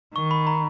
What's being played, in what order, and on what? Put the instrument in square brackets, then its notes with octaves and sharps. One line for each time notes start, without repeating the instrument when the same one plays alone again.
[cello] D#3 [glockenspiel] C#6
[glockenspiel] B5
A#5